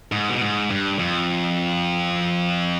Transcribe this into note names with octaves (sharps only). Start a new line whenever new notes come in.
G#2
B2
G#2
G2
F2